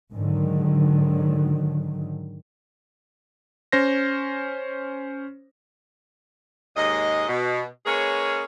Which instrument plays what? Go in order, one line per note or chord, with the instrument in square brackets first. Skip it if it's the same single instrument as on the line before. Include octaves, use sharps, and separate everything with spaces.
[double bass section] G#2 D3 D#3 F#3
[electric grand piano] C#4 C5 A#6
[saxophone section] D#2 G#2 G#3 D#5
B2
G#3 A#3 C#4 G#4 B4 C#5